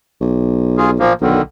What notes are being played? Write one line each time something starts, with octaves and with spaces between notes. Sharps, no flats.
B1
F4 G#4
A#2 F3 A#3
B1 D3 D#3